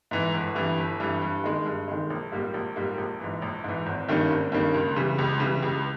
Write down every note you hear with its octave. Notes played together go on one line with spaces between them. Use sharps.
G#2 E3
G1
G2 E3
G1
G2 E3
G2
D#3 G#3
G2
D#3 G#3
A#1
G#2 G3 A#3
A#1
G#2 G3 A#3
A#1
G#2 E3
A#1
G#2 E3
G#1
G2 D#3 A#3 C#4
G#1
G2 D#3 A#3 C#4
C#2
C#3 E3 G3
C#2
C#3 E3 G3
C#2